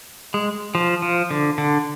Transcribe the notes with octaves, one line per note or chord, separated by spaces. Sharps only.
G#3
F3
F3
D3
D3